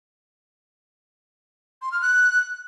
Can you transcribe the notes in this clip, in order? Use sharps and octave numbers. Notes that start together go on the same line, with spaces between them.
C6
F6
F#6